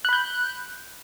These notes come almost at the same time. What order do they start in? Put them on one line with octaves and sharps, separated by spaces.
F#6 B5 G6